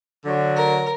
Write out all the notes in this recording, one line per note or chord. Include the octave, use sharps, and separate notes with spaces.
D3 F#3
A#4